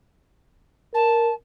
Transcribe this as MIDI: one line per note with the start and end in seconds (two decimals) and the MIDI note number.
0.94 1.31 70
0.94 1.34 81